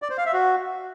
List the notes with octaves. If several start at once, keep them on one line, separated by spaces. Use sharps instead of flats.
D5
C5
F5
E5
F#4